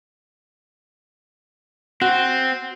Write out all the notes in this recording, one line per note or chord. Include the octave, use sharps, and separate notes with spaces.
C4 F#4